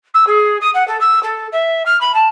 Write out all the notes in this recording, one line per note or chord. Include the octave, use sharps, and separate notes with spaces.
E6
G#4
D#6
F#5
A4
E6
A4
E5
F6
B5
A5